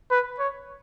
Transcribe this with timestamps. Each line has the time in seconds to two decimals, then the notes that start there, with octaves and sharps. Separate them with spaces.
0.11 B4
0.39 C#5